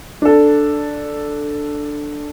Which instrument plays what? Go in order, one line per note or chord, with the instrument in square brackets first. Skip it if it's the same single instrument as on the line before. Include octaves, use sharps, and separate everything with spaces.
[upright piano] D4 A4